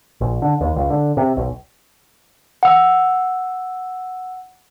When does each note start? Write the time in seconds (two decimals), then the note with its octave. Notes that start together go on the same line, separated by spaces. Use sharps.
0.21 A#1
0.42 D3
0.61 D#2
0.76 C#2
0.90 D3
1.17 C3
1.37 B1
2.63 F#5 E6